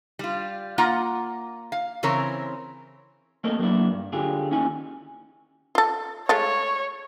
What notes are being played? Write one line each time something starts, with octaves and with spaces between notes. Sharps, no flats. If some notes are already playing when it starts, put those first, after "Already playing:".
G3 F4
A#3 F4 F#5 A#5
F5
C#3 E3 C4 A#4 C#5
A3 A#3 C4 A4 A#4 D#5
F#3 A#3 B3 D4 E4
G2
D3 F4 G4 G#4
D#2 C#4 D#4 E4 G#5
F4 A4
G#3 A3 F4 C#5